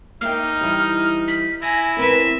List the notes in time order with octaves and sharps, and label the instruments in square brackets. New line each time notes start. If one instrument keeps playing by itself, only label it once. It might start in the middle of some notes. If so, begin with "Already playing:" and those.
[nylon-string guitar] A#3 E5 G5 [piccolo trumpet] D#4 [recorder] F6
[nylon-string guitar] E3 G3
[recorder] B6
[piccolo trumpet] E4 [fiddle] G#5 [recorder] A#6
[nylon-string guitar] E3 C4 A#4 [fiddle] B4 E5